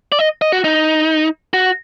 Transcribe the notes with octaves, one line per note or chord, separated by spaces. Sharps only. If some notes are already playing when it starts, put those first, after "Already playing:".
D5
D#5
D#5
F#4
D#4
F#4